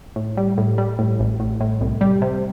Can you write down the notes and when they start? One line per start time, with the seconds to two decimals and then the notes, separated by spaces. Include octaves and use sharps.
0.16 A2
0.37 G3
0.58 A2
0.78 G3
0.99 A2
1.19 A1
1.40 A2
1.60 A2
1.81 C2
2.01 G3
2.22 C3